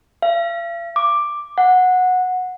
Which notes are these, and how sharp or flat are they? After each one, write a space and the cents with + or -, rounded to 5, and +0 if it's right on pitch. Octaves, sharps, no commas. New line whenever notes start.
F5 -45
D6 +5
F#5 -15